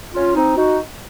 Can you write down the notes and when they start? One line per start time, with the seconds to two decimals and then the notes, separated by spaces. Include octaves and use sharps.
0.14 C#4 F4
0.35 C4 D#4
0.55 D#4 F#4